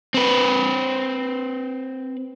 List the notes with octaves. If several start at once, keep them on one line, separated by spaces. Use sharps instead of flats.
C4 B4